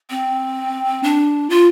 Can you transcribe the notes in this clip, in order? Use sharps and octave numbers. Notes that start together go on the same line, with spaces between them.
C4
D4
F4